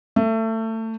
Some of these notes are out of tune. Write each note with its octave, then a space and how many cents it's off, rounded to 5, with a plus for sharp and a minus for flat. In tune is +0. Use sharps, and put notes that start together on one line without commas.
A3 +25